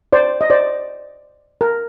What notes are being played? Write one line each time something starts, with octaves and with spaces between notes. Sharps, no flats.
C5 D5
D#5
C5 D5
A#4